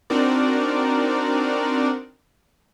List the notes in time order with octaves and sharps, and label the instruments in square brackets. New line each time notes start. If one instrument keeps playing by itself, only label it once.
[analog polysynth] C4 D4 D#4 F#4 A#4 D5